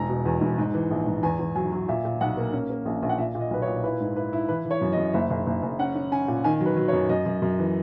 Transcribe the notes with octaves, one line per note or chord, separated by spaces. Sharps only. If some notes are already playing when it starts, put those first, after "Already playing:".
Already playing: E1 A#5
B2
E2
E1
G#2
E3
A#1
G#2
E2 G#5
E2
F#3 G#5
F#3
A#2 E5
A#2
B1 F#5
A#3
C#4
A#3
A#1
A#1
F#5
A#2 E5
A#2
D#5
B1 B4
C#5
A#2
E4 B4
G#2
E4 B4
E4
E3 B4
E3
C#5
F#2
D#5
F#2
F#1 E5
F#1
F#1
F#1
C#4 F#5
C#4
C#4 G#5
A#2
D#3 G#5
F#3
B4
F#3
C#5
F#2
F#2 D#5
F#2
F#2
E3